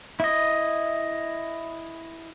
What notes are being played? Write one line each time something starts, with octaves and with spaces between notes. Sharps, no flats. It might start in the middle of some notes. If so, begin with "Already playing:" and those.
E4 D#5